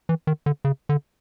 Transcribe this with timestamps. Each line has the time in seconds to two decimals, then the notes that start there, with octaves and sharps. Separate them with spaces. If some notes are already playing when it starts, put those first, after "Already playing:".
0.09 E3
0.27 D#3
0.46 D3
0.65 C#3
0.89 D3